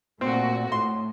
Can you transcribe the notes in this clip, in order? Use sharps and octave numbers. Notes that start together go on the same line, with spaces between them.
A#2 A3 C4 F#4
A2 C6